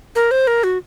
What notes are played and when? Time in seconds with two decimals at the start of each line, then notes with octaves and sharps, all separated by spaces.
0.16 A#4
0.31 C5
0.47 A#4
0.64 F#4